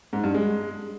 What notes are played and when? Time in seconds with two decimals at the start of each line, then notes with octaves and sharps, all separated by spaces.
0.13 G#2
0.24 G2
0.34 G#3